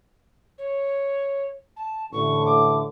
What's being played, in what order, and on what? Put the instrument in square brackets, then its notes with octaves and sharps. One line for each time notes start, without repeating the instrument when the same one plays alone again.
[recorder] C#5
A5
[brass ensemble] A1 D3 A3 [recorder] C#6
[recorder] D6